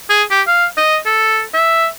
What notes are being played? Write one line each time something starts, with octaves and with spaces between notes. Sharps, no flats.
G#4
G4
F5
D#5
A4
E5